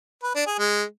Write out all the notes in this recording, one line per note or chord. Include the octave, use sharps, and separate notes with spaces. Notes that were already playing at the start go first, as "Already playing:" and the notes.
B4
D4
G#4
G#3